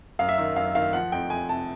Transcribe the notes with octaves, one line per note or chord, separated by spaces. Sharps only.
F#2 F5
E5
D#3
F#2 F5
D#3 F5
F3 F#5
F2 G5
F2 G#5
C3 A5